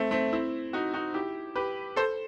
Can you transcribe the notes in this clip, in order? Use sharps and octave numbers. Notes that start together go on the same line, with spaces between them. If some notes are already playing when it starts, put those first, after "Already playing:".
Already playing: A3 C4
A3 C4
C4 E4
D#4 F#4
D#4 F#4
E4 G4
G4 B4
A4 C5